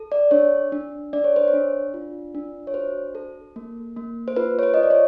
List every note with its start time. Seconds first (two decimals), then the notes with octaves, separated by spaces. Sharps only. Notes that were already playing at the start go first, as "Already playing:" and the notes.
Already playing: A4
0.12 D5
0.31 D4 C#5
0.72 D4
1.13 D4 D5
1.24 C#5
1.36 C5
1.48 C#5
1.53 D4
1.94 F4
2.35 D4
2.67 C#5
2.74 F#4 C5
3.15 A4
3.56 A#3
3.97 A#3
4.28 C5
4.36 F4 B4
4.59 C#5
4.63 C5
4.74 D#5
4.77 F4
4.83 D5
4.91 C#5